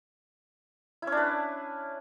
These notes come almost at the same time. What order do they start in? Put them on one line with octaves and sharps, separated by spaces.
E4 C#4 D4 B4